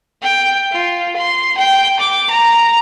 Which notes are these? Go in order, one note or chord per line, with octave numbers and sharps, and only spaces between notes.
G5
F4
C6
G5
D6
A#5